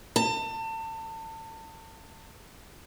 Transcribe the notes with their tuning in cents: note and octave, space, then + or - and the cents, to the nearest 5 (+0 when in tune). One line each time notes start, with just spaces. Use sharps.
A5 +30